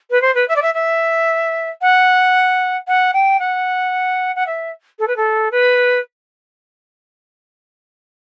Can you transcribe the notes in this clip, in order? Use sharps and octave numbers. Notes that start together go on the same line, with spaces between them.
B4
C5
B4
E5
D5
E5
E5
F#5
F#5
G5
F#5
F#5
E5
A4
B4
A4
B4